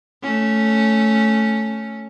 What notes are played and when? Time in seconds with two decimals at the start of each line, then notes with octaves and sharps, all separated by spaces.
0.23 A3 C#4